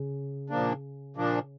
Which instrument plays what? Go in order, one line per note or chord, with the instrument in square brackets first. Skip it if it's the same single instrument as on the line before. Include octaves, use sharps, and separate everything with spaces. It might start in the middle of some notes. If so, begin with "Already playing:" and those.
Already playing: [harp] C#3
[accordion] A#2 F3 A#3 D4
A#2 F3 A#3 D4